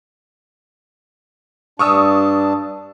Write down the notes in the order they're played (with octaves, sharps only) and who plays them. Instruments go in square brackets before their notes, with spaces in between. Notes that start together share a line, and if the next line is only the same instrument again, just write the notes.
[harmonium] G2 D4 A5 [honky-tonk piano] C#6 D#6 E6